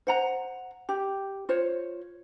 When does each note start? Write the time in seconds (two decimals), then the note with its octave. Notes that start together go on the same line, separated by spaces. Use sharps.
0.07 C5 F#5 A#5
0.89 G4
1.49 F4 C5 C#5